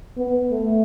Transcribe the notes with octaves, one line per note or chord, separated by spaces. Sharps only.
B3
A3